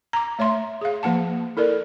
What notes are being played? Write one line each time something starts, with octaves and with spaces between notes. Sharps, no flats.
A#5 D6
A3 C#5 E5 C6
G#4 F5
F3 A#3 F#5 A5
E4 A4 A#4 D5